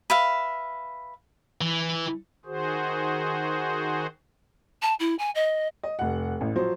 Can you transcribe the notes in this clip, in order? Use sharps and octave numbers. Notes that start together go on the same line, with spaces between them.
B4 E5 F5
E3
D#3 F#4 G#4 C5
A5
E4
G#5
D#5
D#5
F1 F#5
A1
F3 F#3 C5